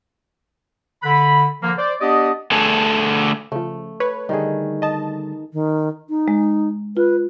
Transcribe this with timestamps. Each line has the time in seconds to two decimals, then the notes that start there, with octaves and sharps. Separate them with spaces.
1.03 D3 B5
1.63 D3 F3 A#3
1.77 C5 D5
2.01 B3 D4 G4 D5 D#5
2.51 D3 A3 G#4 A4
3.52 C#3 F3 A3
4.00 B4 C#5
4.29 D3 D#3 G3 A3 G#4
4.82 D#5 A5
5.53 D#3
6.09 D#4
6.28 G#3
6.97 F4 B4